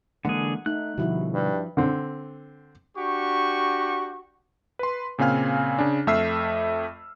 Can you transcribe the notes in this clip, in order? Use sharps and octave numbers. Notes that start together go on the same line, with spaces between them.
D3 E3 G#3 A#3 G#4 F#5
A3 D#4 F#6
B2 D3 F3 G3 E4 F#4
G2
D3 C4
D4 F#4 G4 C#6
B4 C6
A#2 C#3 C4 F5 G#5 F6
C#3 D4
F2 A3 E5 E6 F6 C7